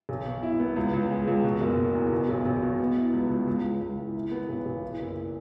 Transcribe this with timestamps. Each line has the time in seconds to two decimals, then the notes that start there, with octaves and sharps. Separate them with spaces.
0.09 B1
0.25 B2
0.43 E4
0.60 B3
0.76 C#2
0.93 C#2
1.10 G#3
1.28 C#2
1.44 B2
1.61 F#1
1.78 B2
1.95 E2
2.13 B2
2.29 B1
2.45 B1
2.62 B2
2.80 B3
2.97 E4
3.13 C#2
3.30 C#2
3.47 C#2
3.64 C#2
3.81 C#2
3.98 E3
4.15 E4
4.31 B3
4.49 B1
4.66 B1
4.83 E3
5.00 F#1